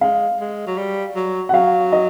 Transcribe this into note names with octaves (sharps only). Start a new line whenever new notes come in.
G#3 F5
G#3
F#3
G3
F#3
F#5
F#3 F5
D#5